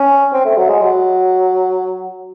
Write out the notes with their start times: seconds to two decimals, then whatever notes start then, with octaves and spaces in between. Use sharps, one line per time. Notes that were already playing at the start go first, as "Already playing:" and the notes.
Already playing: C#4
0.33 C4
0.45 A3
0.57 F#3
0.69 G#3
0.81 F#3